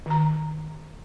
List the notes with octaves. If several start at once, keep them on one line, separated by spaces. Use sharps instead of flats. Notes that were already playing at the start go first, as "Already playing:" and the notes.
D#3 A#5